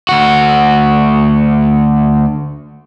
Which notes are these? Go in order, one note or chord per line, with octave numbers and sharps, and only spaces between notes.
D2 F#4